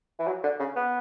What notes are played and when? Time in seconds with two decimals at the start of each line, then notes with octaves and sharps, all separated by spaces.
0.19 E3
0.27 F#3
0.43 D3
0.59 C#3
0.76 B3